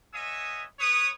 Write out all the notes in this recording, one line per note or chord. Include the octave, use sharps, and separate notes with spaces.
B3 C#5 D#5 E5 G#5 D#6
B4 C#5 D#6